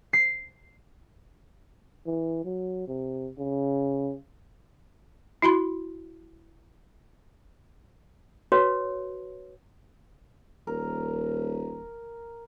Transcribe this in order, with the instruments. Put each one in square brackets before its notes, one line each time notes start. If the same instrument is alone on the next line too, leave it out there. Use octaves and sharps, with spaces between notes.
[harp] C7
[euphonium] E3
F#3
C3
C#3
[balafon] E4 F#4 B5 C6
[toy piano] F#4 B4 C#5
[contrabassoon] D#1 [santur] A#4